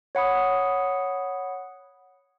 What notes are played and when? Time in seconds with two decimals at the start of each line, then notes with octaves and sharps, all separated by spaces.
0.15 C#5 F#5 B5 D#6